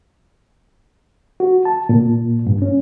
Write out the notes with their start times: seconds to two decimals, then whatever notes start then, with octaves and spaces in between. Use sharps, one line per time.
1.40 F#4
1.65 A5
1.89 A#2
2.47 G2
2.62 C#4